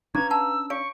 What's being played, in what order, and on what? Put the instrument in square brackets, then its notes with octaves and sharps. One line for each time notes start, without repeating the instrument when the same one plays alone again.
[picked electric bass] C#4 D4 [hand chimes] B4 F5 A#5 [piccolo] G#6
[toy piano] F#5 A5 [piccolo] E6
[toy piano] C#5 F5 [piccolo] C#6 [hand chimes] D7